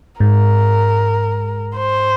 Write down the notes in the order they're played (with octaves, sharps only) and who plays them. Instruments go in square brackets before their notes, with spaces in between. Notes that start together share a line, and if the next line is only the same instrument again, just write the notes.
[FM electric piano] G#2 [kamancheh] A#4
[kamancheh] C5